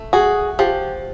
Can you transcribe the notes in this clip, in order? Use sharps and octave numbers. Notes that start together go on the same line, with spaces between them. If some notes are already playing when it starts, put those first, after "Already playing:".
Already playing: A3
F#4 G#4
F3 G4